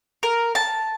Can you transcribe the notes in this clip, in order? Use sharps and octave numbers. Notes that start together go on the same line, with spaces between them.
A#4
A5